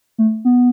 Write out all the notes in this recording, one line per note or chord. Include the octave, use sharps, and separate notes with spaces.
A3
B3